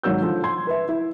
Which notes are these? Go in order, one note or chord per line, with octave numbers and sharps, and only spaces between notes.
G#1 D#3 F#3 E6 G6
D3 F3
C6 G#6
B4 E5
E4